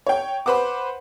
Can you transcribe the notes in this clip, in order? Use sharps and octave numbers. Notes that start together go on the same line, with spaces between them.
C#5 G5
B4 C5 F#5 D6